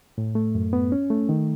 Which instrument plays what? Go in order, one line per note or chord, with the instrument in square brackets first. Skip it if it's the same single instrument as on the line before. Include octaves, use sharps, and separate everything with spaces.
[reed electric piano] A2
A3
F#2
B3
C#4
A3
D#3